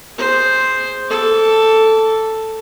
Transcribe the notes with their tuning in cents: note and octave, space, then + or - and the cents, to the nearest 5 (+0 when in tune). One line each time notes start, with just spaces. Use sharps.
G#4 +0 C5 +0
A4 +5 D6 -30